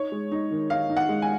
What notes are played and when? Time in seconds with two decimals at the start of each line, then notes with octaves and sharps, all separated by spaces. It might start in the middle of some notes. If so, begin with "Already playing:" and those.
Already playing: D#4 C#5
0.12 G#3
0.32 D#4
0.51 D#3
0.70 D#4 F5
0.90 D#4
0.97 F#5
1.09 G#3
1.22 G#5